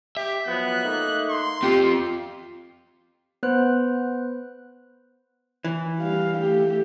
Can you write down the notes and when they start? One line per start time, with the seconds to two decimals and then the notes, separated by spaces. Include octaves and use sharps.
0.17 G4 E5
0.47 F3 F#3 B3 F#6
0.83 A3 A#3 D#4
1.30 C6
1.63 C4 F4 G4
3.43 B3 B4 C5 F#6
5.64 E3
5.99 G3 F5
6.39 A3 G4